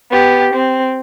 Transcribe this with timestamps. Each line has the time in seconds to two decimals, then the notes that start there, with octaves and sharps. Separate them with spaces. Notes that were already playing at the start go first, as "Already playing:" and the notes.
0.11 B3 G4
0.53 C4